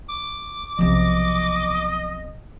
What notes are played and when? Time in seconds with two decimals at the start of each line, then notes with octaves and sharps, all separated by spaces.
0.09 D6
0.79 B1 C3 F3 D#5